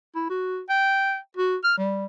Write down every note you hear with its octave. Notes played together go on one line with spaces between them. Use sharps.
E4
F#4
G5
F#4
F6
G3